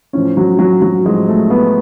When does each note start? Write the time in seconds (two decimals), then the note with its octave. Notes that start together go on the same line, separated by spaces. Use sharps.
0.13 A2 F3 C#4
0.37 F#3
0.59 F#3
0.82 F#3
1.05 A2 F3 G#3
1.28 A3
1.50 B3